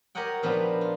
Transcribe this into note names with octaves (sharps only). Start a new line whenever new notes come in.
G4 A#4 C#5 D#5 F#5 G5
A#2 F3 B3 D4 D#4
F4